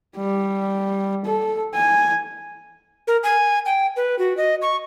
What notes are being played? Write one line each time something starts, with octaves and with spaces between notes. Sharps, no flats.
G3
A4
G#5
A#4
G#5
G5
B4
F#4
D#5
C#6